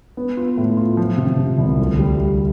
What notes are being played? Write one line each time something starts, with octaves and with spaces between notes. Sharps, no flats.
B3
F4
A2
F4
F3
C3
C3
C2
D2
G3
G3